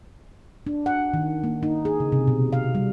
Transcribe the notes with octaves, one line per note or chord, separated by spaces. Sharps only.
D4
F#5
D#3
A#3
D#4
G#4
C#3
C3
B2
F5
G3